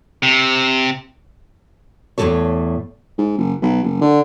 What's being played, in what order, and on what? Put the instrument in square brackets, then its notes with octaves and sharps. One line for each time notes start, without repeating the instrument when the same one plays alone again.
[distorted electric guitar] C3
[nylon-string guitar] E2 A2 C#3 F3 A4 C#5
[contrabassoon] G#2
F#1
B1
F#1
D3